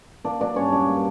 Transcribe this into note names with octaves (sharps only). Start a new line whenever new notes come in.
A#3 D4 D5
F#3 D4 D5
G2 C#4 C#5
A#2 D4 D5
A#3